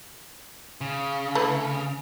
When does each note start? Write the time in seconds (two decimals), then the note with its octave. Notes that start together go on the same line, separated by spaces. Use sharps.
0.81 C#3
1.35 A3 E4 B4